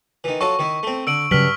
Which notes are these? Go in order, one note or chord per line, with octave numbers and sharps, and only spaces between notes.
D#3 E3
F#3 F4 A4 C#6
D#3 E4
A3 C4
D3 E6 D7 F#7
G2 C#3 F#3 F6 B6 F#7